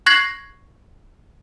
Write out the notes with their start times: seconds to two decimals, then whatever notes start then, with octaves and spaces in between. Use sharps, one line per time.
0.06 C#6 F#6 G#6 A#6 C7 F#7